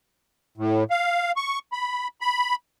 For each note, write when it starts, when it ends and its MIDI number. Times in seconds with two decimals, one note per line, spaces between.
0.57 0.84 45
0.90 1.32 77
1.36 1.59 85
1.72 2.08 83
2.21 2.55 83